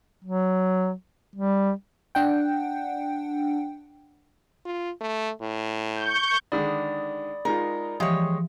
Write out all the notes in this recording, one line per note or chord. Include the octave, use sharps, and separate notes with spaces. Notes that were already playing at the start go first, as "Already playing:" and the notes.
F#3
G3
D4 F#5 G5
F4
A3
A2
C#6 G6
D3 D#3 G#3 D5 B5 D#6
G#3 D#4 F4 A#4
E3 F3 G#3 G4 C#5